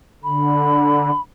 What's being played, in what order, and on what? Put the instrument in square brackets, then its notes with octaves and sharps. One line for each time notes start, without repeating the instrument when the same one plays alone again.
[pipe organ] D3 [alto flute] B5